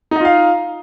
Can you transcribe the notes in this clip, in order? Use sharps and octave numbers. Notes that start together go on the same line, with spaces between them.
D#4 F4 D#5 F5